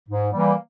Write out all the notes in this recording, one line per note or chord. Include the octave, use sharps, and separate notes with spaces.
G#2
E3 G3 A#3